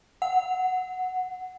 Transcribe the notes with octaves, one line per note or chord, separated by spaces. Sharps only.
F#5